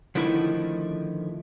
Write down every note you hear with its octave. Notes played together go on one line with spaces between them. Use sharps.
D3 D#3 F3 A3 E4